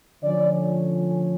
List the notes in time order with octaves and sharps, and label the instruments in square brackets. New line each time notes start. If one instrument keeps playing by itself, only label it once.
[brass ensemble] D3 F3 A3 C#4 D5